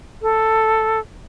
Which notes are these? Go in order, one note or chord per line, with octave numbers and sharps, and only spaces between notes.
A4